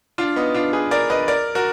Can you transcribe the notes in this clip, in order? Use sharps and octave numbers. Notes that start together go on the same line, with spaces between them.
D4 F4
B3 D#4
D4 F4
G#4 B4
A#4 D5
B4 D#5
A#4 D5
F#4 A#4